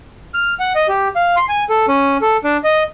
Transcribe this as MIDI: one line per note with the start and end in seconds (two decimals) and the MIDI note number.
0.34 0.54 89
0.60 0.73 78
0.75 0.87 75
0.88 1.08 67
1.16 1.35 77
1.36 1.44 84
1.49 1.64 80
1.70 1.86 69
1.88 2.17 61
2.22 2.37 69
2.44 2.57 62
2.64 2.83 75